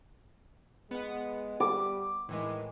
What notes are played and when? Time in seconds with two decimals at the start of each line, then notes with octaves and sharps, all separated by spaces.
0.91 G#3 B3 F#5
1.60 G3 D6
2.29 A2 D#3 E3 G#3